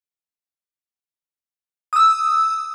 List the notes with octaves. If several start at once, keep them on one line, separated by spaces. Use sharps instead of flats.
D#6 E6